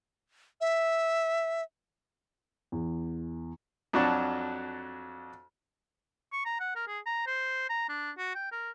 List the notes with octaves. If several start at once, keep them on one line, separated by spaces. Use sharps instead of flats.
E5
E2
F2 F#3 D4 F#4 A5
C#6
A#5
F#5
A#4
G#4
A#5
C5
A#5
D4
F#4
G5
A#4